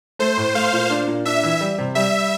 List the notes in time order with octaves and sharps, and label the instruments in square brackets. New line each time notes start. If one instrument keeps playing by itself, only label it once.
[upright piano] A3 [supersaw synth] C5
[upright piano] A2
[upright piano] A3 [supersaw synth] F5
[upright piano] A#2
D4
A#2
[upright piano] D4 [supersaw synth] E5
[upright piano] E3
G3
C3
[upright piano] G3 [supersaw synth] E5